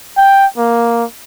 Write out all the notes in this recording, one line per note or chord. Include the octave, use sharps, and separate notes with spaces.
G5
A#3